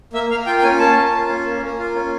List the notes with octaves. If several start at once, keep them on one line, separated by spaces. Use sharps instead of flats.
A#3 E5
A#3 F5
F4 G5
G5
C#4 G#5
A#3 A5
A#3
F4
C#4
A#3
A#3
F4
C#4